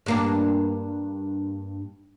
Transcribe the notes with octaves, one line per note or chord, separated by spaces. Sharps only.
G2 A#3 D4